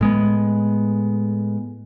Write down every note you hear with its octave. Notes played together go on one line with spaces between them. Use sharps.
A2 G#3 B3